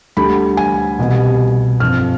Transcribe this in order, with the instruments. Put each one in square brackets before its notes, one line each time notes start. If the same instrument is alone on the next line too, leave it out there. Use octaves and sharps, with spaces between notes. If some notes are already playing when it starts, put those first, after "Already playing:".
[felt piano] D2 D3 G3 B5
G#5
C2 B2 G3
G1 F2 D3 F3 F6